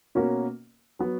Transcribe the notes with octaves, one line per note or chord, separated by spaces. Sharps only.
B2 A#3 C#4 F#4 A#4
F#3 B3 F#4